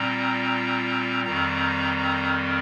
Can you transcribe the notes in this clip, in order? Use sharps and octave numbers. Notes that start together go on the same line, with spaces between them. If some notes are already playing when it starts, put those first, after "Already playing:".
Already playing: A#2 G3 C4 A#5
F2 D#3 G3 C4 A#5
A#5